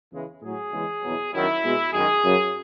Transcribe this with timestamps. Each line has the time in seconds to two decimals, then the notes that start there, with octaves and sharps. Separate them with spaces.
0.12 E2 C#3 E3 G#3
0.42 A2 F#3 G#4
0.72 E2 C#3 G#3
1.02 E2 B2 F#3
1.32 F#2 D#3 F#3 E4
1.63 B2 G#3
1.92 F#2 D#3 G#3 G#4
2.23 F#2 C#3 F#3